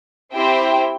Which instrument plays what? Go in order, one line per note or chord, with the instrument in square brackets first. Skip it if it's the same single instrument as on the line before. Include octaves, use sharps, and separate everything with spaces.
[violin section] C4 E4 G4 C5 G5